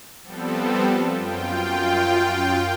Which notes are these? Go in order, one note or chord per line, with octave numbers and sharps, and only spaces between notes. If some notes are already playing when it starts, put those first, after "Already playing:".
F3 G3 B3 C4 A4
F#2 F4 G5